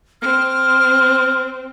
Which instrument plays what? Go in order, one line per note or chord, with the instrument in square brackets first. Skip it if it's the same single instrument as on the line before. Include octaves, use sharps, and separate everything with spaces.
[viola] C4 [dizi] F6